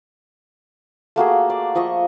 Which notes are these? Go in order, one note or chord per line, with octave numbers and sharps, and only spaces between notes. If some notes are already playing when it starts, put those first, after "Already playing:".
A3 A#3 F#4 G#4
D5
F3 D#5 E5 C#6